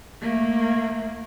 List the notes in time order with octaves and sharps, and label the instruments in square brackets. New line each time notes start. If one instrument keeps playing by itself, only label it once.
[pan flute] A3 [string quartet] A#3